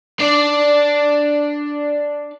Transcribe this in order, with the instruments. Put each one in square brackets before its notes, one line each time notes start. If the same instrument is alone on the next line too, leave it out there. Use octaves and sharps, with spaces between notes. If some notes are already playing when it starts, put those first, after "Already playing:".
[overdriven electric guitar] D4 D5